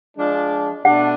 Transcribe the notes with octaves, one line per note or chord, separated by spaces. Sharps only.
F3 G#3 D4
B2 A3 D4 F#5